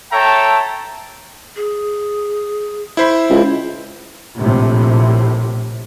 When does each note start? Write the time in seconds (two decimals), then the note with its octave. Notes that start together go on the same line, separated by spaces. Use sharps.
0.12 A4 C#5 E5 G5 A5 A#5
1.56 G#4
2.97 E4 C5 B5
3.30 C#2
4.39 A#1 A2 C3